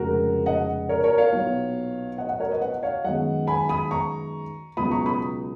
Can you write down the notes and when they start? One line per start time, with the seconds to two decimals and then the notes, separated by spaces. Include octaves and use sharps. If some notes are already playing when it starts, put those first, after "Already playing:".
Already playing: F1 F2 C#3 G#3 F#4 A#4
0.46 D#5 F#5
0.89 A#4 C#5
1.04 A#4 C#5
1.18 C#5 F5
1.33 B1 A#2 F#3 B3
2.18 D#5 F#5
2.29 D#5 F#5
2.40 A#4 C#5
2.51 B4 D#5
2.61 D#5 F#5
2.83 C#5 F5
3.04 F#2 D#3 G#3 B3 D#5 F#5
3.47 G#5 B5
3.69 B5 D#6
3.91 A#5 C#6
4.77 C#2 B2 F#3 B5 D#6
4.91 A#5 C#6
5.06 B5 D#6